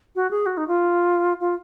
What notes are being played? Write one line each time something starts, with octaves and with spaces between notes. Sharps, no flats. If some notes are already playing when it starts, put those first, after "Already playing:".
F#4
G#4
F#4
D#4
F4
F4